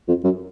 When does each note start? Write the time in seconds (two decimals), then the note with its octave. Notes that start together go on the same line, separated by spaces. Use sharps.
0.08 F2
0.24 F#2